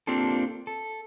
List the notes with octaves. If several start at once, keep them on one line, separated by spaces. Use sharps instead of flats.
A#3 C4 D4 F4 G4 A4
A4